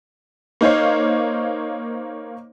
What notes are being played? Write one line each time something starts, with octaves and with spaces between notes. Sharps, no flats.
A#3 D#4 C5 C#5 F5